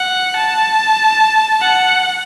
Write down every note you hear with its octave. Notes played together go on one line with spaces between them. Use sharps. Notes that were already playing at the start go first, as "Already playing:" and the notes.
Already playing: F#5
A5
F#5